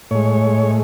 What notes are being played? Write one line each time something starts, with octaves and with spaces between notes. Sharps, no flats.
A2 G#3 C#5